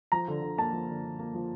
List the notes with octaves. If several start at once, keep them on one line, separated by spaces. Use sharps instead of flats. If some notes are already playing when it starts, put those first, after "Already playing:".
F3 A#5
D3
D3
A#3 A5
F3
D3
D3
A#3
F3